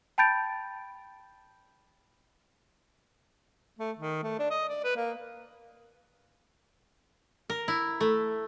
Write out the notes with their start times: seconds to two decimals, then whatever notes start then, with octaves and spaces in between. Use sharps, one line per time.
0.18 G5 A5 B5 G6 A6 D7
3.79 A3
3.98 D#3
4.23 A3
4.39 D4
4.51 D#5
4.69 D5
4.84 B4
4.96 A#3
7.50 A#4
7.68 E4
8.00 A3